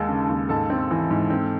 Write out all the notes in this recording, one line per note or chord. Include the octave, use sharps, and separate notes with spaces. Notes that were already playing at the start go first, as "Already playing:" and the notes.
Already playing: D#2 G#3 A4 A5
C#3
D#2
G#2 A4 A5
C4
E3
G#2
C4